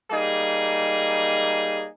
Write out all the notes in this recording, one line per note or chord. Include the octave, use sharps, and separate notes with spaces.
G3 A#3 D#4 G#4